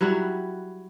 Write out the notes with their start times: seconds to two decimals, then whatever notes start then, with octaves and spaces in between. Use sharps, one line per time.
0.01 F#3 G3 E4 F#4